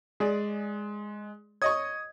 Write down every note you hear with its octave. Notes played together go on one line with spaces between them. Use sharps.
G#3 G#4 D5
C#5 D#5 C#6 D#6 G#6